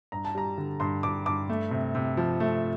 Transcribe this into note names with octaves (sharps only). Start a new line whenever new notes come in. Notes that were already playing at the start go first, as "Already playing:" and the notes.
G2 A#5
A5
G3 A#5
D3
G2 C6
G2 D6
G2 D6
A3
C3
C3
F3
A3